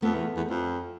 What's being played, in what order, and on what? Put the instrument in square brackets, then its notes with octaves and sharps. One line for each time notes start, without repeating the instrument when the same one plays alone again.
[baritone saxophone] F2 [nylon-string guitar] A3 B3
[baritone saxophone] E2
E2
F2